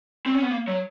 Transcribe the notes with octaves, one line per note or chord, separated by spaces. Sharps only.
C4
C#4
B3
A#3
F#3